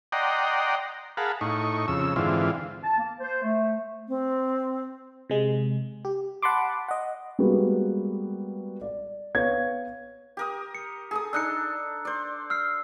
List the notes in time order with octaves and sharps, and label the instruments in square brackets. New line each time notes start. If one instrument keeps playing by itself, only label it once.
[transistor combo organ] D5 D#5 F#5 G5 A#5 C6
G#4 A#4 F5 F#5 A5 B5
A2 D#4 C#6
F2 C#3 E6
G#2 D3 E3 C4 F4
[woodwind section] A5
A#3
C5
A3
[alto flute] C4
[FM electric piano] C3 G#3
G4
F#5 A5 B5 C6 D6
D#5 F#5
[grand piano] G3 G#3 A#3 B3 F#4
D5
B3 C#5 F5 G#6
[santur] G4 A#4 D#6
[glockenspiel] C#7
[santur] G#4 A4 D#6
[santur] D4 D#4 A4 [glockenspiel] E6 F#6 C#7
[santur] C5 D5
[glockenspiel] E6 F6 C7